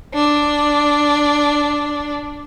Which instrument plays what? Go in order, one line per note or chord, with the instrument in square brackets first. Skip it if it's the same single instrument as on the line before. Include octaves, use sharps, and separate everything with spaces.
[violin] D4